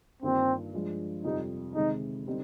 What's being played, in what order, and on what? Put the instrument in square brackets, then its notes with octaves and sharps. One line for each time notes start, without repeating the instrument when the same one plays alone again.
[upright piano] G2 D#3 A#3 D4 F4 [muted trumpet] C4
[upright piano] G2 F3 G#3 D4 F4
[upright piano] F2 C3 G3 [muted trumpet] D#4
[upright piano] C3 D#3 G#3 [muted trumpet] D#4
[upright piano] D3 G3 C4 D#4